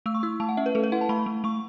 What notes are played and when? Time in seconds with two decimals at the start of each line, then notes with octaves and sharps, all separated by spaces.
0.06 A3 E6
0.15 C#6
0.23 E4 E6
0.40 A3 A5
0.49 F#5
0.57 C#4 E5
0.66 B4
0.75 A3 A4
0.83 B4
0.92 E4 F#5
1.01 A5
1.09 A3 B5
1.26 A3
1.44 A3 C#6